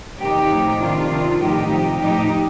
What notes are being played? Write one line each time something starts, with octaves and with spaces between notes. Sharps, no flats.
C3 D#3 D#4 G4
A2 F3
C3 D#3 D4 F4
C3 D#3
A2 F3 D#4 G4
C3 F3
A2 F3 D#4 G4